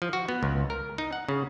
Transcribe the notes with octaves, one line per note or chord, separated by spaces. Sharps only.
F3
F#4
B3
C#2
A#4
D#4
F#5
C#3